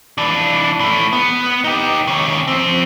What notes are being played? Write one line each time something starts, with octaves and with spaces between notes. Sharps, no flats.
E3 D4
E3 A3
B3
D#4 G4
D#2 C#3
F3 C4